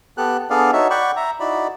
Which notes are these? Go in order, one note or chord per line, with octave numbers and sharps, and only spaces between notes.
B3 G4 A4 F#6
B3 D4 G#4 A4 D5 F5
D#4 F#4 C#5 E5
D5 F#5 G5 B5 C#6
E5 A#5
D#4 E4 F#4 D5 B5